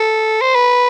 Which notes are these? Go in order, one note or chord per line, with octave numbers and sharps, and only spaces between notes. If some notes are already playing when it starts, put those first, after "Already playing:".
Already playing: A4
C5
B4